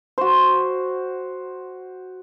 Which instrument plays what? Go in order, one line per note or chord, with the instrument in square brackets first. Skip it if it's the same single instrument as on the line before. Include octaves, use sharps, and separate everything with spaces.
[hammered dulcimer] F#4 C5